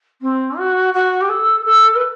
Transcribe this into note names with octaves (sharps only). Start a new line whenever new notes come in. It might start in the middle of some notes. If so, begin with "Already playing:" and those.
C4
F#4
F#4
G4
A4
A4
B4